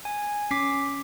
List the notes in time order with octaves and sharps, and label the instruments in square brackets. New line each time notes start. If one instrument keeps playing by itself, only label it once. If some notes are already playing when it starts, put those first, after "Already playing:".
[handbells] G#5
[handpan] C#4 [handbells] D6 B6 C7